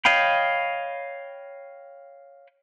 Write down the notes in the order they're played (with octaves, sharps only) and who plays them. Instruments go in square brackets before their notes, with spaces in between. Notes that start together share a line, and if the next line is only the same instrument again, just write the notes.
[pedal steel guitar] C#5 D#5 F5 G5 B5